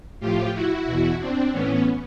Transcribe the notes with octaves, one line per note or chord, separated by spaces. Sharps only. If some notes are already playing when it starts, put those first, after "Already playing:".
A2 F3 F4 G4
E4 F#4
E2 B2
C4 D4
A2 E3 B3 C#4